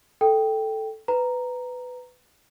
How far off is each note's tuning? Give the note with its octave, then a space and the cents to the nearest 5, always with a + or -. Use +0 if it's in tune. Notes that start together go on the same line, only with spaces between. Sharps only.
A4 +0 G5 +0
B4 +15 A#5 +0